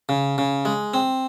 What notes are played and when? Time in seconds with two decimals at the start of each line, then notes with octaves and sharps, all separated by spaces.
0.09 C#3
0.38 C#3
0.65 G#3
0.94 C4